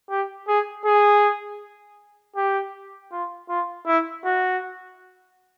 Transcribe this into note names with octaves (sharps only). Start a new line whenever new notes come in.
G4
G#4
G#4
G4
F4
F4
E4
F#4